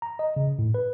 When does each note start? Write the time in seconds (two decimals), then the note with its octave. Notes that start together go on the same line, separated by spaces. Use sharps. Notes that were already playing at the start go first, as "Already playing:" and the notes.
0.02 A#5
0.19 D#5
0.36 C#3
0.59 A2
0.74 B4